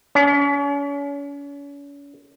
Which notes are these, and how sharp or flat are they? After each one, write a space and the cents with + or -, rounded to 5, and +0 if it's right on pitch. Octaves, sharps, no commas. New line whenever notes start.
C#4 +40